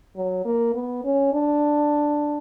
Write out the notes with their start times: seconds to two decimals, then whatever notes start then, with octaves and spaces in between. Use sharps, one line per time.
0.16 F#3
0.45 A#3
0.74 B3
1.04 C#4
1.33 D4